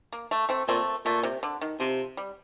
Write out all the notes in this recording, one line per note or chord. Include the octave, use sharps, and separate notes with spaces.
A#3
A3
A3 C4
A#2 A3 C4
A#2 A3
C3
D3
D#3
C3 F3
G3